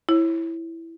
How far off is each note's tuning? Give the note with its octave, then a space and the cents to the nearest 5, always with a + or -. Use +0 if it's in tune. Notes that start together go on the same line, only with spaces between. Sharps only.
E4 +0 C#5 -30